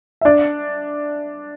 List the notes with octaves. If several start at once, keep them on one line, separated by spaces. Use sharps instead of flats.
E5
D4 D5